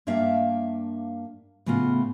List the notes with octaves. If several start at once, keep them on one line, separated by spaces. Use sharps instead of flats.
G2 A#3 D4 E5 F5
A2 C#3 B3 F4